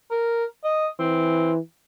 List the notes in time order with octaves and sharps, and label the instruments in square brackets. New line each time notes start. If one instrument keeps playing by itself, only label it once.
[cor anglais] A#4
D#5
[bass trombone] E3 [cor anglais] C4